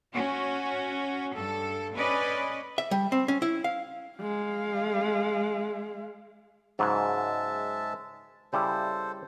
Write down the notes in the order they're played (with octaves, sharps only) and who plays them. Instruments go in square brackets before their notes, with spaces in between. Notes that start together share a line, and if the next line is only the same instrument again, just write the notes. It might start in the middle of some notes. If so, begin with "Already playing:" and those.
[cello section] C#4 F#4
G2 A4
C#4 B4 D5 D#5
[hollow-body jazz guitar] E5
G3
C4
C#4
E4
F5
[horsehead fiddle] G#3 F5
[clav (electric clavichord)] G#2 C#3 F#3 [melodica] G#3 E5 A5
[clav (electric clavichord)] C#3 G3 E4 [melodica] A4 C5